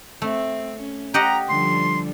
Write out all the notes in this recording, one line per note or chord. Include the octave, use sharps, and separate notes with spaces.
A3 C4
C#4
G4 D#5 F#5 A#5
D3 F3 G3 C6